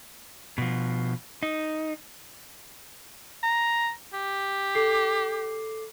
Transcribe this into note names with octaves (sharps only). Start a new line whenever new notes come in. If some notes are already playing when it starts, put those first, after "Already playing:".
B2 F3
D#4
A#5
G4
A4 D6 C7